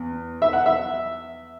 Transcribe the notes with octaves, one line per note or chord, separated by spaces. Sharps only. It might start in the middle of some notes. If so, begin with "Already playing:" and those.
Already playing: E2
E5
F#5
E5